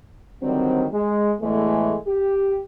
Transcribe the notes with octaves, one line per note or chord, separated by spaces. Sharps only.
D3 D#3 F#3 G3 C4
G#3
E2 A2 E3 G#3 A3
G4